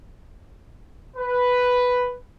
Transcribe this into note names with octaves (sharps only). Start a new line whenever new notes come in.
B4